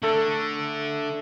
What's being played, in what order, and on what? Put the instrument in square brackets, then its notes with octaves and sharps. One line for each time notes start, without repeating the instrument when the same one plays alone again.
[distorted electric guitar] D3 [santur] A3 A4